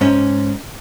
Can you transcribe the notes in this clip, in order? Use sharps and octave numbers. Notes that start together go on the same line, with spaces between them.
G#2 C#4